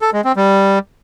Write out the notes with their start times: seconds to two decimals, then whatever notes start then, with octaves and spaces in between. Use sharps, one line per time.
0.02 A4
0.13 G#3
0.25 C4
0.36 G3